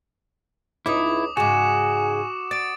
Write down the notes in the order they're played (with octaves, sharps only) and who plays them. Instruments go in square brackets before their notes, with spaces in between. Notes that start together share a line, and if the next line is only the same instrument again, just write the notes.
[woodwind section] C#2 [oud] C#4 D#4 [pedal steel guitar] E4 [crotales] D6 D#6
[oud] G#2 C#3 [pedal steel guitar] F#4 [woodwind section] G#5 [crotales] D6 E7
[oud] D5 [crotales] A6 D7